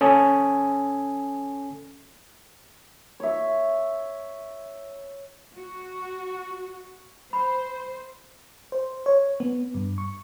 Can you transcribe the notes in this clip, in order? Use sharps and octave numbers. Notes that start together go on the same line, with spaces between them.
C#4 A4 G#5 D#6
C#5 E5
F#4
C5 B5
C5
C#5
B3
G2
C#6